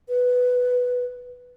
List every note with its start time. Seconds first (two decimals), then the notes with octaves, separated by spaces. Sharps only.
0.08 B4